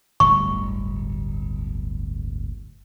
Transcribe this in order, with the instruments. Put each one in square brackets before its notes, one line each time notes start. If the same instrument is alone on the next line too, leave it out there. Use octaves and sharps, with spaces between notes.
[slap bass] D1 G1 [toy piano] C#6